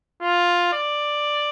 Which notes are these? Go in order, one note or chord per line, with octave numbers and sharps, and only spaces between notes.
F4
D5